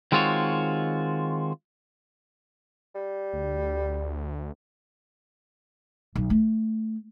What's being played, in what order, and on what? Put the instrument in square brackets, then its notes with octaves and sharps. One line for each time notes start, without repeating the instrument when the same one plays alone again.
[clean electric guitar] D#3 G#3 C4 F4 F#4 C#5
[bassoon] G3
[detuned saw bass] D2
[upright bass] B1
A3